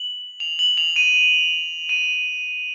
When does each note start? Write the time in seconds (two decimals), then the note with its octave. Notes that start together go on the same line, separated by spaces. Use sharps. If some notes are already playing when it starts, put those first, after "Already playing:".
Already playing: F#7
0.40 F7
0.59 F#7
0.77 F7
0.96 D#7
1.89 D#7